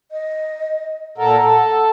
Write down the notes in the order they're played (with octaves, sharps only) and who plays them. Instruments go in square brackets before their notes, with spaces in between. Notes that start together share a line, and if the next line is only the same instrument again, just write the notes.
[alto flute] D#5
[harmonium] A#2 A4 A#4 [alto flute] F#5
[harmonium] A4